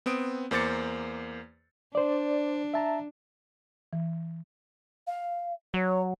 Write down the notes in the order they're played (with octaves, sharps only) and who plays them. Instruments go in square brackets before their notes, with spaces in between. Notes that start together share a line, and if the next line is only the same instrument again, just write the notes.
[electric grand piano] B3 C4 D#6 D7
E2 A#3 C5 D6 A6 C#7
[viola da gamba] D4 [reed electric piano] C5 D5
[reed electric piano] E5 A5 A#5
[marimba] E3
[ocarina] F5
[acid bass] F#3 [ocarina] C#5